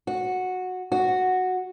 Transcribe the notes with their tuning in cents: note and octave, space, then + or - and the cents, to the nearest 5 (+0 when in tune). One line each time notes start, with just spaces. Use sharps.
F#4 -10
F#4 -5